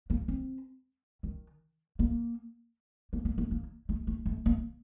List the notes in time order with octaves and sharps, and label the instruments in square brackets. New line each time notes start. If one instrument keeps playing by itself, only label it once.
[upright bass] A#3
C4
D#3
A#3
A#3
A#3
A#3
A#3
A3
A3
A3
A#3